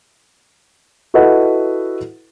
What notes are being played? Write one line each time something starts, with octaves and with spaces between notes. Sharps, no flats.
E4 F#4 A4 B4 D#5 F#5